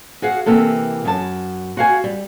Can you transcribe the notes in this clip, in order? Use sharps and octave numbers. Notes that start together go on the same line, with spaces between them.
F#4 G#4 F5 F#5
C3 E3 A#3 A4
F#2 A5
F#4 F5 G#5
G3